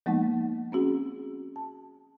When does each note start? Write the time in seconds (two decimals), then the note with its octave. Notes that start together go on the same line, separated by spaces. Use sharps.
0.06 F3 G#3 A#3 B3 D#4 F#5
0.72 C4 C#4 F#4 G#4
1.56 A5